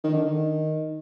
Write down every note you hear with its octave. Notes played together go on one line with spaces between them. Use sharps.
D#3
D3
D#3